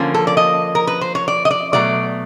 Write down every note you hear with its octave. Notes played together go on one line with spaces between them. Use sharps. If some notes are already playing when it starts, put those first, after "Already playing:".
Already playing: D3 F3 A#3 C#4
A4
D5
D#5
A#4
B4
C5
C#5
D5
D#5
D5
B2 F#3 A3 D5